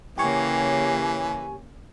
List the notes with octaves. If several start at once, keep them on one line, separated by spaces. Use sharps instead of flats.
C#3 E3 A#3 G4 C#5 G#5